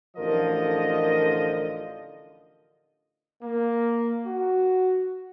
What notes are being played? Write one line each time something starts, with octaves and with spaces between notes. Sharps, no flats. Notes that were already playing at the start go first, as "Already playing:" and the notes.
A1 D3 F3 A#4 D#5
A#3
F#4